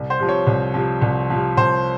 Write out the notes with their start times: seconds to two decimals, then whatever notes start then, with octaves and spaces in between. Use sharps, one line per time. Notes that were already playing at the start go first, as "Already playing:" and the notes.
Already playing: C2
0.10 C5
0.20 C3 F3
0.29 C#5
0.47 C2
0.74 C3 F3
1.02 C2
1.30 C3 F3
1.57 C2 C5